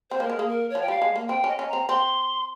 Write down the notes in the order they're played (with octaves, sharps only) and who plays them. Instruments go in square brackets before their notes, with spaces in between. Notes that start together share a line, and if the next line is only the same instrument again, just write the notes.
[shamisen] C4 [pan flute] C5
[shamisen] A#3 [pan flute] A#4
[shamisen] G#3
[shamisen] A#3 [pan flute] G#4
[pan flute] A#4
C#5
[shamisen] F3
[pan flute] G5
[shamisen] G3 [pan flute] F5
[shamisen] G#3
A#3
[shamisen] C4 [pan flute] G5
[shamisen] C#4 [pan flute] D#5
[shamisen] C#4
[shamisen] C4 [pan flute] A#5
[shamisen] C4 [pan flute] C6